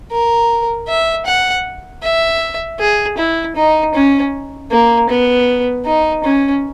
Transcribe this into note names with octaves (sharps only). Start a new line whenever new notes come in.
A#4
E5
F#5
E5
G#4
E4
D#4
C#4
A#3
B3
D#4
C#4